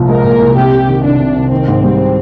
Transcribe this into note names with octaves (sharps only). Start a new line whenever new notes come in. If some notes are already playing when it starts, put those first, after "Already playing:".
Already playing: C2 A#2 F3
G#3 A#4
A#2
C2
C3 G4
C2
D#3
C2 D4
C3
C2
D#3 C4
G#2
G3